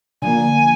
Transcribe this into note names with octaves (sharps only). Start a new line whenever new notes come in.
D3 F3 A#3 G#5